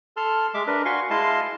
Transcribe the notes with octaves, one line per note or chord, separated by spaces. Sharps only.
A4 A5 C6 F6
G#3 E5 D6
D4 A#4 B4
F#4 F5 G#5 C6 C#6
G#3 E4 D#5 F5 A5 C6